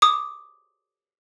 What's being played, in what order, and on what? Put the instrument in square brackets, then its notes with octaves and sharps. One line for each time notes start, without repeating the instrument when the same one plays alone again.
[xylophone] D6 D#6